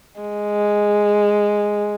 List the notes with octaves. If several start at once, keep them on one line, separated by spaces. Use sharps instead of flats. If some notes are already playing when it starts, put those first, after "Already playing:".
G#3